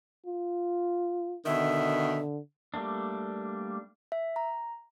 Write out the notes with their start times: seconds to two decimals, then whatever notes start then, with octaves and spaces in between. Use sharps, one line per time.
0.26 F4
1.46 B2 D3 D#3 E5
2.74 G3 A3 A#3 D4
4.12 E5
4.36 A#5